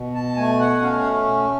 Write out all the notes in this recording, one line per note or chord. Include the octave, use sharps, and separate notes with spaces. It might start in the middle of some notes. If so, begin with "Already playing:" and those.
Already playing: B2
A5
A3 G#5
F#5
C#4 F5